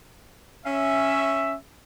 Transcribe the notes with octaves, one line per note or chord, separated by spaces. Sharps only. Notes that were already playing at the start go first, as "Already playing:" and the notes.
C#4 E5